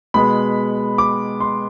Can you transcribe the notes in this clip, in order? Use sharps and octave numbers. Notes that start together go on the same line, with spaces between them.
B2 G#3 B3 B5
D6
C6